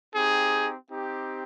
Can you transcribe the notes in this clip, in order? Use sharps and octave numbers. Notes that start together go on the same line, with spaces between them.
C4 D#4 G4 G#4
C4 D#4 G4